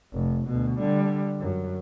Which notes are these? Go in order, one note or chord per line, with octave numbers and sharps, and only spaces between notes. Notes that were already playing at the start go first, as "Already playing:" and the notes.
F1
D2 B2
D3 G3
F#2